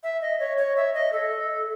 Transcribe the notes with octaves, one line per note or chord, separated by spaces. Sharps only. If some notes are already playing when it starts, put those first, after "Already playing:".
E5
D#5
C#5
C#5
E5
D#5
A4